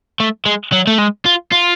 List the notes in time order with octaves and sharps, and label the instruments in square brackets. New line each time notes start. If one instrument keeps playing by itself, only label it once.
[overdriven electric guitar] A3
G#3
F#3
A3
G#3
F4
F4